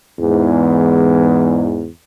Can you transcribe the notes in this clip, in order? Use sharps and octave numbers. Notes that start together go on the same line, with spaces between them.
E2 G#2